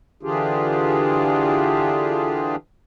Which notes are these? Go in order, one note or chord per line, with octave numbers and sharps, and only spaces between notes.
D3 E3 D4 F4 G4 G#4